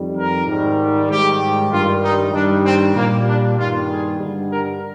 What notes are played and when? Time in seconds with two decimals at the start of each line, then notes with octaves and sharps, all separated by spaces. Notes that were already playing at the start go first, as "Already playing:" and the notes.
Already playing: F2 D#3 G3
0.16 A#4
0.47 G#2 D#3 G3
1.09 G#2 D#3 G3 G4
1.71 G2 D#3 G3 F4
2.03 D#4
2.34 G2 D#3 G3 D4
2.65 C4
2.96 A#2 G3 A#3
3.27 D4
3.58 G2 D#3 G3 F4
3.89 G#4
4.19 G2 D3 G3
4.51 A#4